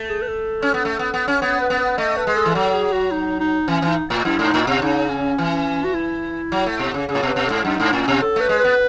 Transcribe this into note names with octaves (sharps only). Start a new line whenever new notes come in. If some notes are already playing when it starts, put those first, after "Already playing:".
Already playing: A3
G#4
B4
A4
C#4
B3
A3
B3
B3
C#4
B3 C#5
B4
B3
B4
A3 D#5
B4
G#3
A4
E3
F#3 A4
G#4
F#4
D#4
D#4
E3 C#4
E3
D#4
A2
F#2 E4
G#2 D#4
A2
B2
C#3 D#4
C#4
E3
F#4
E4
F#3
A3
B2
C#3
C#3 G#4
A2
B2
B4
B2
G#2 A4
F#2 D#4
G#2
A2 C#4
B2
A4
A3 B4
G#3
B4
B3